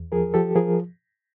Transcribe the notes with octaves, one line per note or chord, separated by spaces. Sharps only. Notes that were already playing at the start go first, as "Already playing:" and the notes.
Already playing: E2
F3 G#4 A#4
F3 G4 A4
F3 G#4 A#4